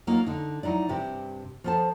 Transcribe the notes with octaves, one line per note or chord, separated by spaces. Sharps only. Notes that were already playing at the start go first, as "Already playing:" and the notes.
F#3 A#3 D#4 F4
D3 D#4
F#3 D#4 E4 D5
G2 C3 G4
F3 B3 A4 C5 A5